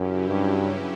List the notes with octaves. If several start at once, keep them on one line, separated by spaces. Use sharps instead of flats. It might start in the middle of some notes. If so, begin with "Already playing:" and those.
Already playing: F#2 C#3 F#3 C#4 E4 G4
G2